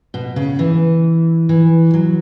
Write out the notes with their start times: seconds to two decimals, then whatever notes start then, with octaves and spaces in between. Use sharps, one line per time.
0.14 B2
0.36 C#3
0.59 E3
1.49 E3
1.94 F#3